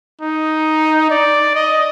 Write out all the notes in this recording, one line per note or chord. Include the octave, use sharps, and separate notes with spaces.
D#4
D5
D#5